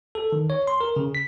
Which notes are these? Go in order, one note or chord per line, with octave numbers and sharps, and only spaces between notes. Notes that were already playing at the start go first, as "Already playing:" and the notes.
A4
D#3
C#5
C6
A#4
C#3
B6